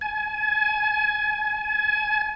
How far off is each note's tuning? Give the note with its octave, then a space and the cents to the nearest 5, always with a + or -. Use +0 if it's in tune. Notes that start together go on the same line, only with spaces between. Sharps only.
G#5 +30